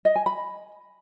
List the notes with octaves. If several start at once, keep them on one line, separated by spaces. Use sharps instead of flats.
D#5
G#5
B5